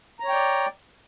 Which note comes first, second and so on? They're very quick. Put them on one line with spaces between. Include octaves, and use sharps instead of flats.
A#5 C#5 G5 D5